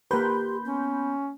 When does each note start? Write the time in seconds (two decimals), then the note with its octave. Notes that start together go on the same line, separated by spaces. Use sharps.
0.11 A#3 G4 A#4 B4 B5 C6 G6
0.65 B3 C#4